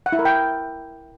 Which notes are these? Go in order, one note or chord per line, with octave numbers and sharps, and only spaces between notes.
F#5
E4
A#4
G5